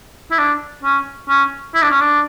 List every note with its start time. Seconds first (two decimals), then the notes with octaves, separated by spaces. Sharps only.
0.31 E4
0.38 D4
0.83 C#4
1.29 C#4
1.74 E4
1.82 D4
1.91 C#4
2.01 D4